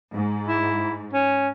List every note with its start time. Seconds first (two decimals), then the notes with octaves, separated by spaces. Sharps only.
0.14 G#2
0.48 E4
1.13 C#4